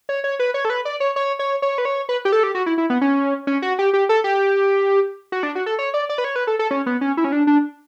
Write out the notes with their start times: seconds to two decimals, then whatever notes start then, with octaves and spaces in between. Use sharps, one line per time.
0.09 C#5
0.24 C#5
0.39 B4
0.54 C#5
0.65 A4
0.70 B4
0.85 D5
1.00 C#5
1.16 C#5
1.39 C#5
1.62 C#5
1.78 B4
1.85 C#5
2.09 B4
2.25 G4
2.32 A4
2.43 G4
2.55 F#4
2.66 E4
2.78 E4
2.90 B3
3.01 C#4
3.47 C#4
3.62 F#4
3.79 G4
3.93 G4
4.09 A4
4.24 G4
5.32 F#4
5.43 D4
5.55 F#4
5.66 A4
5.79 C#5
5.94 D5
6.09 D5
6.18 B4
6.24 C#5
6.36 B4
6.47 A4
6.59 A4
6.71 C#4
6.86 B3
7.01 C#4
7.17 E4
7.24 C#4
7.32 D4
7.47 D4